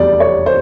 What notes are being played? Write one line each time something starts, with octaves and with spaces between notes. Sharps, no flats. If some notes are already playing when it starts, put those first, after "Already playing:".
Already playing: F1 E2 B2 G3 B3 D5
C#5
C5